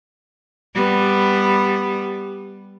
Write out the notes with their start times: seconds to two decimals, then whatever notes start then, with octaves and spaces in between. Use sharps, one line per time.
0.75 G3 B3